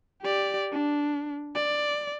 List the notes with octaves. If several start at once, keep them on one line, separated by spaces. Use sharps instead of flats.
G4 D5
D4
D5